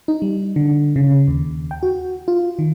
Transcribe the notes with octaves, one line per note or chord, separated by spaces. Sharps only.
D#4
G3
D3
C#3
D#2
G5
F#4
F4
D#3